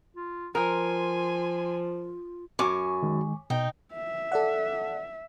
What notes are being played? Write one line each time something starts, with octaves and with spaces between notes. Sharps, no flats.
F4
F3 F4 A#4 G#5 C6
F#2 G#5 C#6 D6
D#3 G#3
B2 D#4 G5
E5
A4 D5 F#5